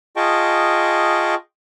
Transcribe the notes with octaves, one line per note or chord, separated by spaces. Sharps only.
F4 G#4 D#5 G5 A5 C#6